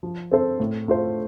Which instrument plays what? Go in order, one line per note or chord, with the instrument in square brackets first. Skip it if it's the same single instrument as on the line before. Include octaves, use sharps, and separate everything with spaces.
[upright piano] F3
C4 A4 C5
A2
A3 F4 C5